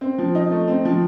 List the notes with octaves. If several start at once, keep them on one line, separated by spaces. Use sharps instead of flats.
C4
F3
D#4
A3
C4
F3